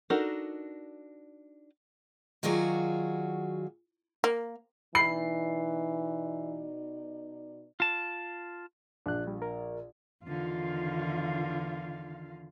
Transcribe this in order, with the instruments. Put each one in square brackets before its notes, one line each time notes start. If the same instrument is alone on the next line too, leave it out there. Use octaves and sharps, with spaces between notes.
[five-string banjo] D4 D#4 F#4 A4 A#4
[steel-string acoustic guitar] D#3 F#3 F4 F#4 G#4 D5
[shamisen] A#3
[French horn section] B2 D#4 D5 [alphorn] E3 [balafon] B5 [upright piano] C7
[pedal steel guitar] F4 A5
[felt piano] A#1 [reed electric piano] D4 F#6
[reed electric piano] G3
A#4
[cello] E2 D3 [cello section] D#3 F4 F5